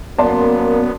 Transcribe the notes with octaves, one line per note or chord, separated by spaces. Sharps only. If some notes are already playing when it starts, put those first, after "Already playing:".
F#2 A#3 B3 D5 A5 C6